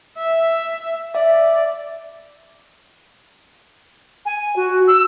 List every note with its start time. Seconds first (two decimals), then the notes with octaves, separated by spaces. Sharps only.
0.18 E5
1.15 D5 E5
4.25 G#5
4.55 F#4
4.87 E6